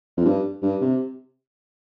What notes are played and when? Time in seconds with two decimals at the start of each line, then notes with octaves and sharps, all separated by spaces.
0.17 F2
0.25 G2
0.62 G2
0.81 C3